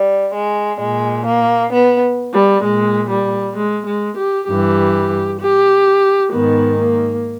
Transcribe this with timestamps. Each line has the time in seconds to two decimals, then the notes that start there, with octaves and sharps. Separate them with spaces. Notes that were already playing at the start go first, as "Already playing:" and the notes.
Already playing: G3
0.33 G#3
0.79 A#2 G#3
1.25 A#3
1.71 B3
2.33 G3
2.63 A#2 G#3
3.09 G3
3.56 G#3
3.86 G#3
4.17 G4
4.48 G2 E3 G4
5.39 G4
6.32 G#2 D#3 B3
6.77 A#3